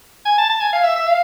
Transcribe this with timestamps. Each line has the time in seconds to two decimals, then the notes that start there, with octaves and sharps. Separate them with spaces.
0.25 G#5
0.38 A5
0.49 A5
0.61 G#5
0.73 F5
0.83 E5
0.96 E5
1.07 F5